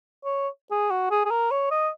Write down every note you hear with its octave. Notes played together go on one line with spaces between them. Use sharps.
C#5
G#4
F#4
G#4
G#4
A#4
C#5
D#5